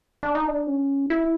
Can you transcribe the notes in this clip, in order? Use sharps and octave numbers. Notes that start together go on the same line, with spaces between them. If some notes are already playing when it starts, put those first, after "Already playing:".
D4
D#4
D4
C#4
E4